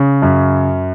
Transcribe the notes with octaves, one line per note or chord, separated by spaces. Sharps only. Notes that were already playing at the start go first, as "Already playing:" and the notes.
Already playing: C#3
F#2